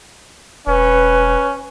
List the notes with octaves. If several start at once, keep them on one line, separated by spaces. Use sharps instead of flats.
E1 C#4 B4